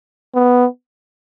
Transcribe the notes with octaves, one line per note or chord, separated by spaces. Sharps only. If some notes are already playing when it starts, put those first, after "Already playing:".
B3